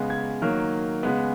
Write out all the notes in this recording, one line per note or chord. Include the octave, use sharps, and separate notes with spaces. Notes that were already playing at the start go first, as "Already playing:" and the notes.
Already playing: C#3 G#3 B3
G#6
D#3 F#3 A#3 F6
C#3 G#3 B3